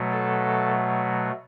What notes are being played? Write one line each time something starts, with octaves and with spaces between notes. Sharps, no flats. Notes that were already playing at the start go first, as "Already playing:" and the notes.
Already playing: B2 F#3 A3
A4